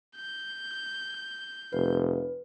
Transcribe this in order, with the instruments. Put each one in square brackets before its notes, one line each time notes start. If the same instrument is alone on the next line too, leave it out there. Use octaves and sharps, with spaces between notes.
[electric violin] G6
[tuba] F1 [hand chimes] B4